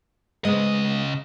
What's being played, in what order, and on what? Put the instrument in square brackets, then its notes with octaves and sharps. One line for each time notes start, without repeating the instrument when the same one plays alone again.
[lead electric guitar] C#3 D#5 [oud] G#3 B3